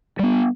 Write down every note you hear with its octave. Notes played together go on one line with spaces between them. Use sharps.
G3 B3